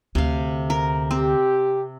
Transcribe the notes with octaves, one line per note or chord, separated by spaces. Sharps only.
D2 C3 A3 F5
A#4
C4 G4